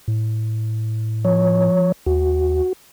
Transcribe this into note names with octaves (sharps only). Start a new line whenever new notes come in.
A2
F3 C#5
D#2 F#4